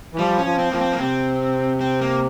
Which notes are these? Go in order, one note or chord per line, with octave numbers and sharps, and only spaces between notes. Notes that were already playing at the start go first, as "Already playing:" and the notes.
E3
F3 G3
C#4
F3
C4
F3 A#3
C4
A#3
C3 C4
C4
A#3